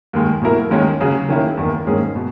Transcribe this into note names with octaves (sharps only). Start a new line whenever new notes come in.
D#2 D#3 G#3
B2 F#3 A#3 E4 A#4
D#2 D#3 G#3 C#4
C#3 F#3 C#4 G#4
D#3 A#3 C#4 E4
E2 D#3 A#3
G#2 D#3 A#3 C#4 G#4
B2